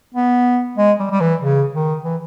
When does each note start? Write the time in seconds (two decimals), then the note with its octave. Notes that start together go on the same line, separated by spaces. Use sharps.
0.14 B3
0.78 G#3
1.00 G3
1.11 G3
1.20 E3
1.41 C#3
1.73 D#3
2.04 E3